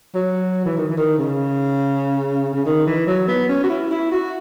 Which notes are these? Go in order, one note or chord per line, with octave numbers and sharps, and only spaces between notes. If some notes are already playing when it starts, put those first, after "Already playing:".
F#3
E3
D#3
E3
D#3
C#3
C#3
D#3
E3
F#3
B3
C#4
F#4
E4
E4
F#4